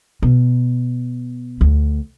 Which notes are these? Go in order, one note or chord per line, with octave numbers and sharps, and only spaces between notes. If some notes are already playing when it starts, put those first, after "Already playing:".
B2
D2